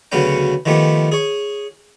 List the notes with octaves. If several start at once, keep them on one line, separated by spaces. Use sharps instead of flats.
D2 C#3 F#3 B3 C#4 G5
D#3 F3 A3 B3 G4
G#4 C#5